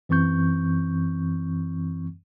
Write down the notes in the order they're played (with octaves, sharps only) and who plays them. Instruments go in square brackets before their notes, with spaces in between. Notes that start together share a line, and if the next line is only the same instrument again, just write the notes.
[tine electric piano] F#2 E3 C4 C#6 G6